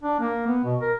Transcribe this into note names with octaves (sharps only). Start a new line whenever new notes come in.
D4
A#3
B3
B2
A#4